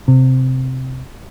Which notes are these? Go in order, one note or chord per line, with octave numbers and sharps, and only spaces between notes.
C3